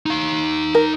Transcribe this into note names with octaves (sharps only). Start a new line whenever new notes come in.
D#4 F5
A#4